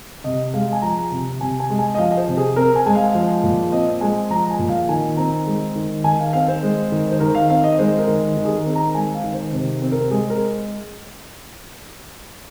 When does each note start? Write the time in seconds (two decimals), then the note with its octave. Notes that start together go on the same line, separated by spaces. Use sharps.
0.24 C3 D#5
0.54 G#3 F5
0.73 G#5
0.82 F3 A#5
1.12 C3
1.41 C3 G#5
1.60 G#5
1.70 G#3
1.79 G#5
1.94 D#5
1.98 F3 F5
2.11 D#5
2.17 C5
2.28 C3
2.37 G#4
2.56 C4 A#4
2.76 G#5
2.86 G#3 G#5
2.95 F5
3.15 F3
3.43 A#2
3.72 C4 D#5
4.01 G#3 G#5
4.30 F3 A#5
4.51 G#5
4.59 A#2
4.69 F5
4.89 D#3 G#5
5.17 C4 A#5
5.47 G#3
5.76 D#3
6.04 D#3 G#5
6.19 F5
6.33 C4 F5
6.48 C5
6.63 G#3
6.92 D#3
7.12 C5
7.20 D#3 A#4
7.35 F5
7.50 C4 F5
7.64 D#5
7.78 G#3 C5
7.98 A#4
8.07 D#3
8.37 D#3
8.45 G#4
8.55 A#4
8.66 C4
8.75 A#5
8.95 G#3 G#5
9.14 F5
9.24 D#3
9.34 C5
9.53 C3 C5
9.82 C4
9.92 A#4
10.11 G#3 G#4
10.30 A#4